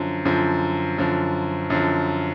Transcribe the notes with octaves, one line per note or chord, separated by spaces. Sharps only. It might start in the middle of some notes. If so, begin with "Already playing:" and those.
Already playing: F#2 D3 F3
F#2 D3 F3
F#2 D3 F3
F#2 D3 F3